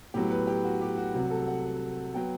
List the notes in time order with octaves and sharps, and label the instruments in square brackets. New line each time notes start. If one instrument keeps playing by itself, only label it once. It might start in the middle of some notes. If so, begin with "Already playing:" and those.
[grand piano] A2 F#3 B3 G4
B4
G4
F#4
G4
F#4
C2 C3 F#3 F#4
A4
F#5
F#3 B3 G5